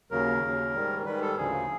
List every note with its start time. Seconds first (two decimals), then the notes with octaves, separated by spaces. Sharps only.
0.11 D#2 C#3 F#3 A#4
0.42 D#2 C#3 F#3
0.74 G#2 D#3 G3
1.05 G#2 D#3 G3 B4
1.22 A4
1.37 D2 C#3 F3 G#4